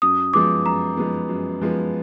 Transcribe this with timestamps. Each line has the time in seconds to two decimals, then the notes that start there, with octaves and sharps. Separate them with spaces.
0.02 F#2 D#6
0.33 F3 G#3 B3 D6
0.66 F#2 A#5
0.97 F3 G#3 B3
1.29 F#2
1.61 F3 G#3 B3